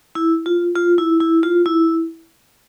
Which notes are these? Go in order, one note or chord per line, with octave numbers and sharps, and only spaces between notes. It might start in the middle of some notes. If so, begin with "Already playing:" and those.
E4
F4
F4
E4
E4
F4
E4